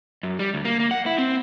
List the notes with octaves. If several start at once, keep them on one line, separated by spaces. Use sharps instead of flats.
F#2
G3
D2
A#3
A#3
F#5
E4
C4